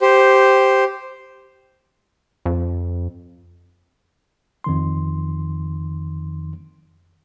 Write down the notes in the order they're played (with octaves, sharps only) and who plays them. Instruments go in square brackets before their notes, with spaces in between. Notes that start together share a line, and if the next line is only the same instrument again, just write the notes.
[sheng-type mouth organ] G4 C5
[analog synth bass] F2
[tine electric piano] F2 D#3 C6